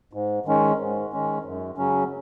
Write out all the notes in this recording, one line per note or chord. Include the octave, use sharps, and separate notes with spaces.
G#2
D#3 G#3 C#4
G#2
D#3 G#3 C#4
F#2
C#3 F#3 C#4